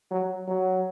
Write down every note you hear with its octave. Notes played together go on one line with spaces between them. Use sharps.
F#3
F#3